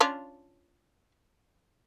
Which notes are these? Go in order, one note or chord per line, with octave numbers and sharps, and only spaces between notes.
C#4 D4 F4